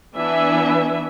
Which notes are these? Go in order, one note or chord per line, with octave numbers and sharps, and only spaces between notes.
E3 B3 D4 E4 E5 G#5